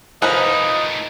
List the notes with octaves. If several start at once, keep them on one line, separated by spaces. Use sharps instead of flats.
F3 A3 D#4 A#4 B4 D#5